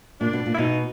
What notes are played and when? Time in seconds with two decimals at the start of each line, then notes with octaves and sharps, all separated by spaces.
0.20 A#2 D4
0.33 B2
0.46 A#2
0.54 E4
0.58 B2 D#4